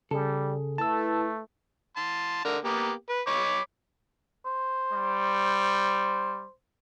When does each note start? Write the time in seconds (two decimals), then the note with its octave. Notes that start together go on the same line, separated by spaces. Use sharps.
0.11 C#3 G3 G#4 A4
0.78 A3 E4 B4 A5 E6
1.97 A5 C6
2.45 D3 A#4
2.64 A#3 B3 G4
3.09 B4
3.27 C#5 B5 D6
4.45 C5
4.93 G3